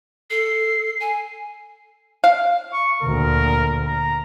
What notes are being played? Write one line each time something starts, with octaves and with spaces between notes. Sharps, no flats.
A4 C7
G#5
F5
C#6
D2 A#2 A#4
A#5